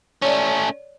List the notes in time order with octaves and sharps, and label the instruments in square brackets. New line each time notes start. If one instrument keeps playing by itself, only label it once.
[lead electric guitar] A3 C#4 [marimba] C#5 D5